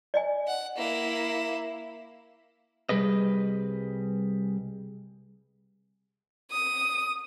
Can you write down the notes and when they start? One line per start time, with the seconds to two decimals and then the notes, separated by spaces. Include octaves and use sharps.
0.14 D5 D#5 G#5
0.47 F#5
0.77 A#3 E4
2.89 C2 A#2 G3 G#4 B4 D#5
6.50 D#6